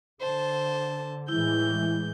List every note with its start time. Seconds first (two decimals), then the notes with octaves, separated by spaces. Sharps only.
0.21 D3 C5 A5
1.28 A2 E3 G#3 E4 G6